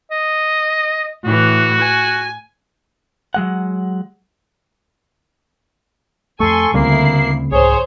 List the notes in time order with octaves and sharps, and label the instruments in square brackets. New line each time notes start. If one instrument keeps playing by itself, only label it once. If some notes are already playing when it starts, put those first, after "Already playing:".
[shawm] D#5
[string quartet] A2 E3 [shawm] F#4
[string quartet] G#5
[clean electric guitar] F#3 G#3 F#5
[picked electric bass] F2 A3 [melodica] A4 C#6 [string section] G#5 C6
[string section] D2 E4 C7 [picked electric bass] C#3 G3 C4 [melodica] A#3
[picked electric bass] C2 G#2 [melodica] G#4 [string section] C5 C#5